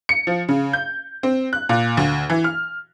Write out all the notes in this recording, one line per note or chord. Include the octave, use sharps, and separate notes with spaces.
C#7
F3
C#3
G6
C4
F#6
A#2
D2
E3
F6